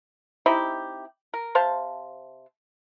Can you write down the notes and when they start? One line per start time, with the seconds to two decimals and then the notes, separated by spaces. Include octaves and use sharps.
0.46 C4 D#4 E4 G4
1.34 A#4
1.55 C3 C5 F5 A5